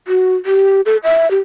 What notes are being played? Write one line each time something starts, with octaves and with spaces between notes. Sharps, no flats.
F#4
G4
A4
E5
G4